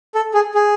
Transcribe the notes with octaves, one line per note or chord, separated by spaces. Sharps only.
A4
G#4
G#4